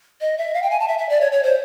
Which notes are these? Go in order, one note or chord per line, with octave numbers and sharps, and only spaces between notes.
D#5
E5
F5
G5
G#5
A5
E5
E5
D5
C#5
C#5
C5